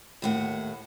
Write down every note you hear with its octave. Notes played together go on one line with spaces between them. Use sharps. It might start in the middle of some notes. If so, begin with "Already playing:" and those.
D#2 A2 F#5